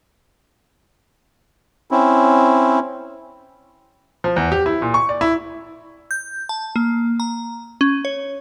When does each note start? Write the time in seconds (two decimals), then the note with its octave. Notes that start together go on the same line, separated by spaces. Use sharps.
1.91 C4 C#4 E4
4.24 F3
4.36 E2
4.52 G4
4.66 E4
4.82 A#2
4.94 C#6
5.09 D5
5.21 E4
6.11 G6
6.49 A5
6.76 A#3
7.20 A#5
7.81 C#4
8.05 C#5